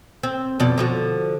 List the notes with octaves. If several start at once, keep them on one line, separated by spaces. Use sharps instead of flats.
C4
F2 B2 D5
D3 F3 F#4